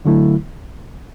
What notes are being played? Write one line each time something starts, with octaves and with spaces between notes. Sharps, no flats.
D2 D3 F#3 A3 E4